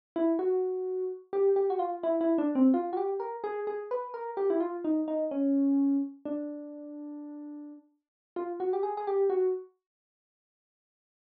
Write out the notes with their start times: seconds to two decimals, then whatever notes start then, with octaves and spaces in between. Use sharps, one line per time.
0.16 E4
0.39 F#4
1.33 G4
1.56 G4
1.70 F#4
1.79 F4
2.03 E4
2.21 E4
2.38 D4
2.55 C4
2.74 F4
2.93 F#4
2.97 G4
3.20 A#4
3.44 G#4
3.67 G#4
3.91 B4
4.14 A#4
4.37 G4
4.50 E4
4.60 F4
4.85 D#4
5.08 D#4
5.31 C#4
6.25 D4
8.36 F4
8.60 F#4
8.73 G4
8.83 G#4
8.97 G#4
9.07 G4
9.30 F#4